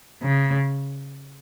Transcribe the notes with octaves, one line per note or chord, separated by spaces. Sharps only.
C#3